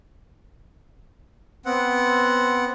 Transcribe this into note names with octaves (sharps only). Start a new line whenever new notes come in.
B3 C4 F#5